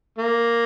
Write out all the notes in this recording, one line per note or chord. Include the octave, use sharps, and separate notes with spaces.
A#3